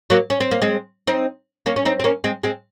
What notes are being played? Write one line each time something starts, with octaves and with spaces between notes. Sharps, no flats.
F#3 A#3
C#4
C4
A#3
G#3 C4
C4 D#4
A#3 C#4
C#4
C4 D#4
C4
A#3 C#4
G#3 C4
G#3 C4